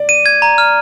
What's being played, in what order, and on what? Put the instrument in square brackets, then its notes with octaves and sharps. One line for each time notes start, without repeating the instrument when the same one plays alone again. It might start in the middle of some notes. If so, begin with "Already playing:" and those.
Already playing: [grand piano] D5
[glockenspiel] D#7
G#6
A#5
F6